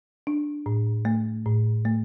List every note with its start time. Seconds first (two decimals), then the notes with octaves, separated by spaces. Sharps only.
0.27 D4
0.66 A2
1.05 A3
1.46 A2
1.85 A3